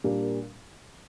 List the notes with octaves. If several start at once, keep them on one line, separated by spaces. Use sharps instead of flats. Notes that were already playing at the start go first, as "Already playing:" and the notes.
A#2 G3 A#3 D4 A#4